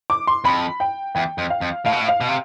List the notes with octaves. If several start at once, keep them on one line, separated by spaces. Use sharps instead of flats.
D6
C6
F2 B5
G5
E2 G5
F2
F5
F2
A2 F5
B2
A2
F5
B2
C3